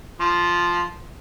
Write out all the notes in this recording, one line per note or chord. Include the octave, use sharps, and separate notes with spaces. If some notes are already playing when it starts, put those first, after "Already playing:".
F3 C6